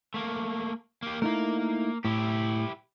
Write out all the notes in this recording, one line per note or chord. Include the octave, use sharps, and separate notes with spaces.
A3 A#3
A#3 G4
A3 A#3 D#4 E4 A#4
A2 E4 G4